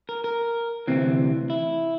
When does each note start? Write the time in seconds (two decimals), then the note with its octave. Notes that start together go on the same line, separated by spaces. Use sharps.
0.09 A#4
0.24 A#4
0.87 D2 C3 E3 C4
1.50 E4